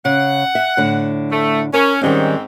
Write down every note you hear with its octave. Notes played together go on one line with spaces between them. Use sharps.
C#3 F#5
E5
A2 D3
A3
C#4 A#4
G#2 D#3 G3 C4 C#4